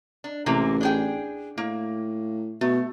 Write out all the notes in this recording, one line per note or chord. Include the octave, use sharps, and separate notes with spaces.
D4
A1 C3 G#3 A#3
D4 G#4 G5
A2 A#3
B2 A3